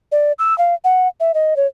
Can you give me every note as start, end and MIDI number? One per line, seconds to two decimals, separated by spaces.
0.12 0.32 74
0.39 0.57 88
0.58 0.75 77
0.84 1.08 78
1.20 1.32 76
1.34 1.56 75
1.56 1.67 73